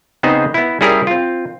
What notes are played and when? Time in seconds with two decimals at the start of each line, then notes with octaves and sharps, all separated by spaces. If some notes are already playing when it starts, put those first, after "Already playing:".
0.23 C#3 B3 C4 D#4 G#4 C5
0.54 B3 E4
0.81 G3 C#4 E4 G#4 A#4 E5
1.07 C4 F4